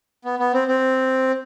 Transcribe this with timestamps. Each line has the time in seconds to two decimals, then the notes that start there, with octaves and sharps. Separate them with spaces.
0.25 B3
0.39 B3
0.54 C4
0.68 C4